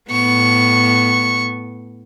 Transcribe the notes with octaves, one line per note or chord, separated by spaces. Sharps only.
A2 B3 C#6